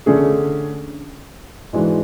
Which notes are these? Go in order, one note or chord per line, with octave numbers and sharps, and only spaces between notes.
D3 A3 C#4 G#4
G#2 E3 G#3 D4 F#4